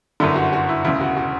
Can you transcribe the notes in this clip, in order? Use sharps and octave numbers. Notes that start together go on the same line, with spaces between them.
G1 F#2 D3 E4
F#4
F#4
E4
E1 D2 C#3 E4
F#4
F#4